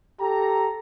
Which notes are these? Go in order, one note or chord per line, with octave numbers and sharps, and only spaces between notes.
G4 A4 A#5